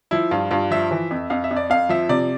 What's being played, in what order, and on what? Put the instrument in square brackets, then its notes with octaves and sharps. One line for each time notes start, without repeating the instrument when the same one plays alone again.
[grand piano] F3 E4
G2 F4
G2 F4
F3 E5
E3
F2
F2 F5
E5
F2
D5
F2 F5
F3 E5
C3 D5